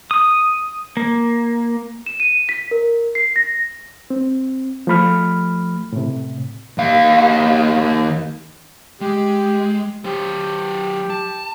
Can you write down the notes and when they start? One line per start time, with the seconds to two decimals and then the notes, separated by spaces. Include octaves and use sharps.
0.11 D#6
0.97 A#3
2.06 E7
2.20 D#7
2.49 B6
2.71 A#4
3.15 C7
3.36 A#6
4.10 C4
4.87 F3 A3 B5 F6
5.92 A2 C3
6.78 D#2 F5
9.01 G#3 G4
10.05 F#3 G4 C5
11.10 A5